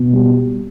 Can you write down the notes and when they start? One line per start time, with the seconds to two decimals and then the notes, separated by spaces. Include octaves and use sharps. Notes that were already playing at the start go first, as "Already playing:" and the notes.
Already playing: B2
0.13 G3